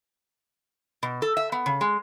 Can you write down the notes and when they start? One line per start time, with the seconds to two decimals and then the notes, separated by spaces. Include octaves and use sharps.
1.03 B2
1.22 A4
1.37 E5
1.52 B3
1.66 C#3
1.81 G#3